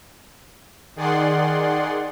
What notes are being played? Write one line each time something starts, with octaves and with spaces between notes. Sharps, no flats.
D#3 G#4 D5 F#5 C6